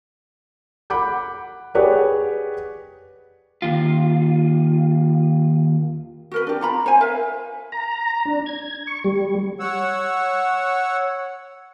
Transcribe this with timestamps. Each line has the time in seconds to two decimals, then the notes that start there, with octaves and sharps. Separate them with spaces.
0.90 F#5 B5 D6 G6
1.75 G4 G#4 B4 C#5 D5 F#5
3.62 D#2 F4
6.32 F#4 A#4 B4
6.47 D4 G4
6.61 F4 A#5 B5
6.86 C5 G#5
7.01 A#4 B4 E5 F5
7.72 A#5
8.25 D4
8.46 G#6
8.87 C#6
9.04 G3
9.60 C#5 F#5 E6